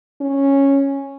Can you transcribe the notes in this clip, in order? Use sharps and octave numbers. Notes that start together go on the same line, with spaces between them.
C#4